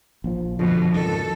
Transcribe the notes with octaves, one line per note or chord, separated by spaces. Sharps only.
A#1 F3
F2 B2 D3 F3
C#2 G#2 D#3 A4